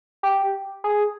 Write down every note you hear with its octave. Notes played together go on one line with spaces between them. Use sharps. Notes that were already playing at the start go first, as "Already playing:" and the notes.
G4
G#4